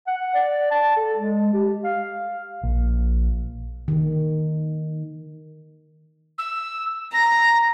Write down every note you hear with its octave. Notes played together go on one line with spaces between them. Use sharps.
F#5
D5
A5
A4
G#3
G4
F5
A#1
D#3
E6
A#5 A#6